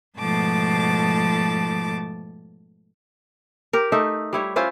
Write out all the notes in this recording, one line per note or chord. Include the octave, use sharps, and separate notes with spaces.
G#2 B2 F3 A3 A5 D6
G4 A#4
A3 D#4 E5
G3 E4 C#5
C#4 E4 F4 C5